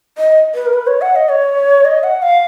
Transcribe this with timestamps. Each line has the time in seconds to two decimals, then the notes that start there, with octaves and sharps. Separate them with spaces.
0.18 D#5
0.55 B4
0.66 A#4
0.73 B4
0.87 C#5
1.02 F#5
1.16 D#5
1.29 C#5
1.85 D#5
2.04 F#5
2.22 F5